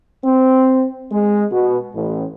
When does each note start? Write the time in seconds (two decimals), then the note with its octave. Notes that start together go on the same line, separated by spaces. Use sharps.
0.25 C4
1.12 G#3
1.51 B2
1.95 A1